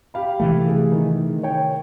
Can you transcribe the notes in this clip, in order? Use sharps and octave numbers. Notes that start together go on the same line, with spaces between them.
G4 F5 B5
C3 E3 A3
G#4
D#3
C#5 G5